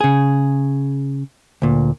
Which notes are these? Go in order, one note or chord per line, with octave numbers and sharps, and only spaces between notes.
C#3 G#4
D2 A#2